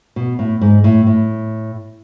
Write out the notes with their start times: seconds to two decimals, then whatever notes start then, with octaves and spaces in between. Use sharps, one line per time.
0.16 B2
0.39 A2
0.61 G#2
0.84 A2
1.07 A2